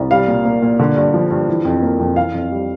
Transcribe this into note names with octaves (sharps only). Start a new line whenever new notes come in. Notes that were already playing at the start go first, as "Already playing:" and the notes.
Already playing: C2
G3 F5
A#2
A#3
A#2
D3
G2
F3
G2
E3
F2
A#3
F2
E3 F5
F2
G3